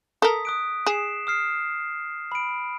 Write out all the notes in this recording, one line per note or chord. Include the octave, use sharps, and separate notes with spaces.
A4 A#4 D#6 B6
D#6 F#6 D7
G#4 C7 E7
D#6 F6 C7
B5 D7